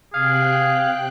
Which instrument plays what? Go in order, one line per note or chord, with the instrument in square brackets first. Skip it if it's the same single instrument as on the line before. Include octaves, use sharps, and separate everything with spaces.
[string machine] C3 G5 F#6 [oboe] G#4 [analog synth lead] F5